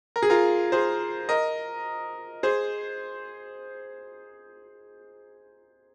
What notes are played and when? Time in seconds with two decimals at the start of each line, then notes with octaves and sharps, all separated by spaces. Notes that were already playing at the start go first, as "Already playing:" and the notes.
0.16 A#4
0.22 G#4
0.30 F4 A#4
0.72 G#4 C5
1.29 A#4 D#5
2.43 G#4 C5